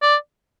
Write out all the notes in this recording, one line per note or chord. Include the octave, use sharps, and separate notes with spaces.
D5